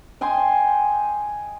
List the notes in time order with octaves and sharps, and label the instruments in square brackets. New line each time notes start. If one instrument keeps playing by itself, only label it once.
[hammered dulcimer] D#5 G5 G#5 C6